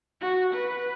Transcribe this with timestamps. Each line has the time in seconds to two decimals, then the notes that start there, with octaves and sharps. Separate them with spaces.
0.21 F#4
0.54 B4